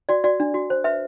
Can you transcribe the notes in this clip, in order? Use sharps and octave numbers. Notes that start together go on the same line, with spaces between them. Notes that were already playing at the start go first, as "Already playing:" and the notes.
F#4 D5
F#4 D5
D4
F#4
C5
B4 E5